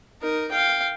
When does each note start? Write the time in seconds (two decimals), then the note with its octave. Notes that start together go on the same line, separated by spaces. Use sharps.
0.22 D#4 A#4
0.51 F5 G5